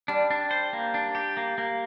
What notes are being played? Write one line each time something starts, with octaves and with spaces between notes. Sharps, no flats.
G3 D4
D4
C5
A#3
D4
G4
A#3
A#3